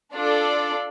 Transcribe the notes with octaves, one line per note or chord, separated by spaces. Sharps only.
D4 F4 A4 D5